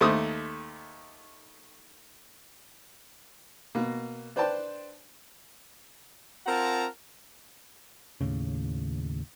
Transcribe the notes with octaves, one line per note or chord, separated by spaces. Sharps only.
D#2 A3 C5 D6 D#6
B2 A#3
D4 B4 C5 D5 G5 A5
C4 F4 A#4 F#5 A5 A#5
D#2 A2 C#3